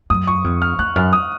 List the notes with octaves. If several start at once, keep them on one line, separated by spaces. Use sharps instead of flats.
F#2 D#6
C#6
F2
F6
F2 F#6
F#2 F6
D#6